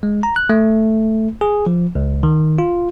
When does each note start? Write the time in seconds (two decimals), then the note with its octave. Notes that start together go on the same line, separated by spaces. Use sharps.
0.03 G#3
0.23 A#5
0.36 F#6
0.49 A3
1.41 G#4
1.66 F3
1.95 C#2
2.23 D#3
2.59 F4